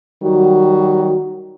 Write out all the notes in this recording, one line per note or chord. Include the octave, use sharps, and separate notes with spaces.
D#3 F#3 G3 F#4